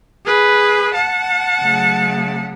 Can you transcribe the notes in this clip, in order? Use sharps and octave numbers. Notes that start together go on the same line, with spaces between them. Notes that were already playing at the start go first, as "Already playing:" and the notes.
G#4 B4
F#5 A5
C#3 F#3 A3